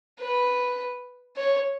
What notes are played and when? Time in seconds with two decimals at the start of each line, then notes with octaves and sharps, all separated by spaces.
0.20 B4
1.36 C#5